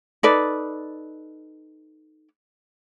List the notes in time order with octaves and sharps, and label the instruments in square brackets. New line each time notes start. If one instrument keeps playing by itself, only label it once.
[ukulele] D#4 A4 B4 D5